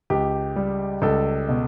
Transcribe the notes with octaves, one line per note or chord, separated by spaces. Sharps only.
C#2 G4
G3
C#2 A4
B2